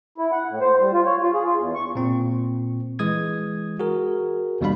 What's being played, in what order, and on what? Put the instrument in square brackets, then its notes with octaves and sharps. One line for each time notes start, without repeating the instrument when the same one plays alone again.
[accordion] E4
F#5
A2
C5
G3
F4
C#5
F4
G#4
F4
E2
C#6
[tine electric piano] A#2 C4
E3 G#3 D#6 G#6
F#4 G#4 A#4
D#2 B2 G3 D4 F5 B5